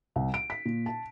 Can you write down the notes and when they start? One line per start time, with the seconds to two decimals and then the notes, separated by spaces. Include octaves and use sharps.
0.16 C2
0.34 D7
0.50 B6
0.65 A#2
0.86 A5